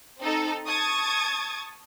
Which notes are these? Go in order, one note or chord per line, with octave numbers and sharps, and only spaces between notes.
C4 D#4 A4
A5 C#6 D#6 G#6 A6